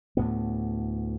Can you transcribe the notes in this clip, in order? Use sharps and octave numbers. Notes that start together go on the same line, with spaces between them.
D2 A2 B3